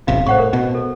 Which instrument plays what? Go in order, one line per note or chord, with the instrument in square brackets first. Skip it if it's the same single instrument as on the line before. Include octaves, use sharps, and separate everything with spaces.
[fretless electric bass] E1 A1 C3 [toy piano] F5
[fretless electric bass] A2 [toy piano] C5 F#5 C#6
[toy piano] A#4
[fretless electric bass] B2
[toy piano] A4